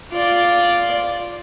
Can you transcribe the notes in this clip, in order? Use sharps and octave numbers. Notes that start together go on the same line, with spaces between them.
F4 D5